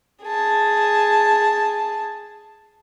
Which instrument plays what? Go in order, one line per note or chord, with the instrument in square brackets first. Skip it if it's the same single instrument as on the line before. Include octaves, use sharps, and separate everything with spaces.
[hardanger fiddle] G#4 A5